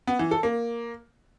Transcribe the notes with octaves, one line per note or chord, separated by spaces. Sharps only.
B3
E3
A4
A#3